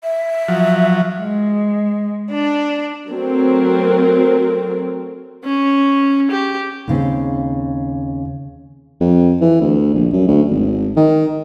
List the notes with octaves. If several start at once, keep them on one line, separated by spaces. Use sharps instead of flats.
E5
F3 F#3
G#3
D4
F#3 A3 C4 A#4
C#4
G4
D#2 C#3 C4
F2
E3
D2
A#1
F#2
D2
G#1
D#3